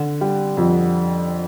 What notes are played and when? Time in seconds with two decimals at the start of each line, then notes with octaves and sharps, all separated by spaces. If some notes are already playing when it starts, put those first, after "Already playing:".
Already playing: D3
0.21 G3
0.57 F2